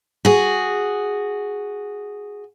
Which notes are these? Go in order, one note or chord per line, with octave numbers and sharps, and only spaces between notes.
F#4 G#4